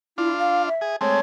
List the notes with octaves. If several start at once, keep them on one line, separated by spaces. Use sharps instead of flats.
D4 E4 F4
F5
E5
G#4
G#3 A3 C4 C#5